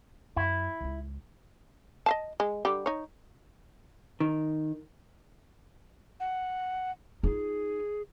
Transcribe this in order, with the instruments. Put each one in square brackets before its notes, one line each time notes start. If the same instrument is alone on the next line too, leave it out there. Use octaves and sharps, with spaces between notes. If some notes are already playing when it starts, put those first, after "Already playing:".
[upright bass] F#2 [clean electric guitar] E4
[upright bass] C#2 F4
[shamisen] D#5 F5 A5
G#3
D3 G3 G4
D#4 C#5
[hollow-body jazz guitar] D#3
[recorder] F#5
[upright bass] D#4 F4 [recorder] G#4